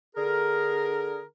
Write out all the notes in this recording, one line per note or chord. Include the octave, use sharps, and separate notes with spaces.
D3 G#4 A#4